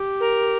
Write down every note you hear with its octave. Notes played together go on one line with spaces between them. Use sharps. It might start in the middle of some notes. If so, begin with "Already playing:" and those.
Already playing: G4
A#4